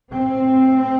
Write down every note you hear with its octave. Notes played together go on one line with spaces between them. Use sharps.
A2 C4